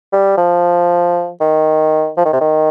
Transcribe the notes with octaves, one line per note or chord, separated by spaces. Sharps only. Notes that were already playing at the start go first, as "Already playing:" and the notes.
G3
F3
D#3
F3
D#3
C3
D#3